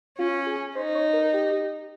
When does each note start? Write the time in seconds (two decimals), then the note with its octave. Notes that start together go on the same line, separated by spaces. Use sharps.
0.18 C#4 F4
0.46 G#4
0.75 D#4 C5
0.94 C#5
1.13 A#4
1.33 G4